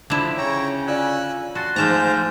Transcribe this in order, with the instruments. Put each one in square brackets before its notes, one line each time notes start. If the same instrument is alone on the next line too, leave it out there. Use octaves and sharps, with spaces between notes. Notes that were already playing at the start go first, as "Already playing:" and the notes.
[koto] D3 E4 [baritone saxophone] F3
[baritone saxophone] C#3 [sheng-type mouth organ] C#5 G5 A#5
[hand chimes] F4 D5 F5 [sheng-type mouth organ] G#5 E6 F#6
[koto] F#4 [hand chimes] A5 F#6 A6 [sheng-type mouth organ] C6
[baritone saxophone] G#2 [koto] F3 A5 A#5 [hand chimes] A3 F6 [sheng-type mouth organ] C5 G6